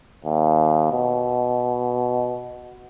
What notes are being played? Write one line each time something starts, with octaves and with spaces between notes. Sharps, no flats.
D#2
B2